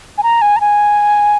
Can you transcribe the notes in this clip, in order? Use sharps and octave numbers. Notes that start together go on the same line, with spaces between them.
G#5
A#5
G#5
A#5
G#5